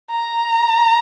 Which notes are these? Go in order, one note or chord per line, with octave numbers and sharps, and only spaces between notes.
A#5